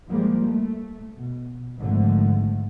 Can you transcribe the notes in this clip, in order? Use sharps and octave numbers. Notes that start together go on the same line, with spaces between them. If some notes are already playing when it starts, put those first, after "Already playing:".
F3 G3 G#3 A#3
A3
B2
G#1 G#2 D3 F3 A3